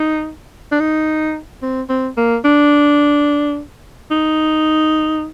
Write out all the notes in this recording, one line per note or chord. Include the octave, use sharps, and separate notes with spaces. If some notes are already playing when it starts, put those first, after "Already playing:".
Already playing: D#4
D4
D#4
C4
C4
A#3
D4
D#4